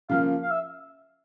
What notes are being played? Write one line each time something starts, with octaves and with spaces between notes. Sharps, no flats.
C#3 F3 A#3 F5
F5
E5